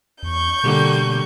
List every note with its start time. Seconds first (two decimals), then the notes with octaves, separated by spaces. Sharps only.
0.23 E2 C#6 G6
0.63 B2 D3 G3 A#3